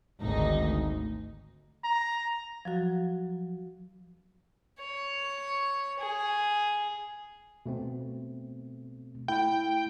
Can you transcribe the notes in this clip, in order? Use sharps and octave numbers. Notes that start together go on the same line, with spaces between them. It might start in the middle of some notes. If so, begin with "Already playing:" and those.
G#1 D2 D#4
A#5
F3 F#3 F#4
C#5
G#4
B2 A3 C4
A3 E4 G5